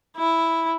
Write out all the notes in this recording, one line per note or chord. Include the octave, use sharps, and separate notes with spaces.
E4